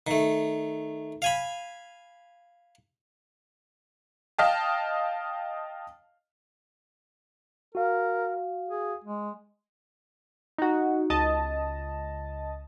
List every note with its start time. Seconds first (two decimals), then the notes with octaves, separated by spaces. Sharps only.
0.07 D#3 A3
1.22 F5 G#5 B5
4.38 D#5 F5 G5 A5
7.75 F#4 A#4 F5
8.69 G#4
9.04 G#3
10.58 D#4 F#4
11.10 C#2 D#5 A5